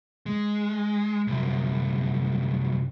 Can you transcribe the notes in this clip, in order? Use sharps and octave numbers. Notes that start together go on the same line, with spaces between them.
G#3
C2 F#2